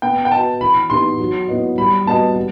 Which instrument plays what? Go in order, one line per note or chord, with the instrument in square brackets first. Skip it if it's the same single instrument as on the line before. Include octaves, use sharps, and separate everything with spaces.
[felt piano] B3 [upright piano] G5
[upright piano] G5
[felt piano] F#4 B4 D#5 [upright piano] A5
[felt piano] E3 [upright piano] B5
[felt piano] B3 D#4 G4 [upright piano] C6
[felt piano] F#3
B3 E4 B4 D#5
[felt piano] G3 [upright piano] B5
[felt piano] B3 F#4 B4 D#5 [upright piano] A5
[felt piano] G3